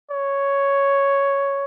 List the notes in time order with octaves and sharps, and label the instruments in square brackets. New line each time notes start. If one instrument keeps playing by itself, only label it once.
[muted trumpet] C#5